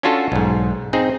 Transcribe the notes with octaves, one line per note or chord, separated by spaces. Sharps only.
C#4 D4 F4 F#4 A4
B1 G#2
C4 D#4 G#4